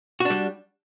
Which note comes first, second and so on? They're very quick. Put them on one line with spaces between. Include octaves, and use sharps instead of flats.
F#4 D4 G3